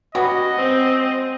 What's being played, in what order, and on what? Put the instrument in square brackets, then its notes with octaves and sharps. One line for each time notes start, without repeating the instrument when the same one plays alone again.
[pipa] G3 B3 C#4 [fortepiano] F#4 [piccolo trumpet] D#5
[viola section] C4